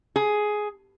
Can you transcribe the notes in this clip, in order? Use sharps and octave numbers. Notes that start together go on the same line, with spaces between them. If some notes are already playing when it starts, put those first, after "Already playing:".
G#4